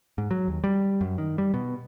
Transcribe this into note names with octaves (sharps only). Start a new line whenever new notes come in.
G#2
F#3
D#2
G3
F#2
D#3
G3
B2